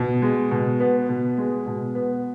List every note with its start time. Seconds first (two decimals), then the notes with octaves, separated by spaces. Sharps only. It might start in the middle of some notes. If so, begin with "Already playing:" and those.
Already playing: B2
0.22 G#3
0.51 B2
0.80 B3
1.09 B2
1.38 G#3
1.66 B2
1.95 B3